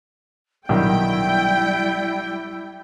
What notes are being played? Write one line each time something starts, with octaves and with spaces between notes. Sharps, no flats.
B1 G2 D#3 G3 E4 G5